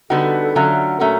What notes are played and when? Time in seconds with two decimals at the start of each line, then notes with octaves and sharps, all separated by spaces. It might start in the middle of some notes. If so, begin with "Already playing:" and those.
0.10 D3 G3 B3 D#4 F#4 A4
0.55 D3 F#3 A3 C#4 F4
1.00 A#2 F#3 A3 C#4 F#4